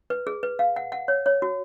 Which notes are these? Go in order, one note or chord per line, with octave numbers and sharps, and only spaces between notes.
B4
G#4
B4
F5
F#5
F#5
C#5
C#5
F#4